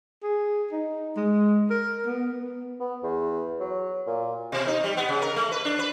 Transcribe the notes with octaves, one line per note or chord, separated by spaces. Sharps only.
G#4
D#4
G#3
A#4
B3
B3
B3
E2
F#3
A#2
B2
D#4
G3
B3
C#3
A#4
A3
B4
D4
B4